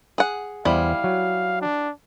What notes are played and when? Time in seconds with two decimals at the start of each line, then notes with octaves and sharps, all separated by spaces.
0.18 G#4 F#5
0.65 E2 G3 E4 C5 F5
1.04 F#3
1.62 D4